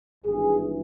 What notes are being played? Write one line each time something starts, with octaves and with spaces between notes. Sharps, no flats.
G#1 G2 E3 G#4